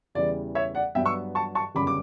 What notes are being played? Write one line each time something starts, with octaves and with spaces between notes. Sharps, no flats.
E2 C#3 E3 G3 D5
C#5 E5
D5 F#5
G2 F#3 B3 E5 G5
C#6 E6
A5 C#6
A5 C#6
G1 F#2 C#3 G3 C#4 B5 D6
D6